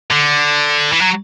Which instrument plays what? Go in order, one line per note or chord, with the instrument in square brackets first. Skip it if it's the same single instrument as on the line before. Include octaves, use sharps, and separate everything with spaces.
[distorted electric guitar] D3
E3
F#3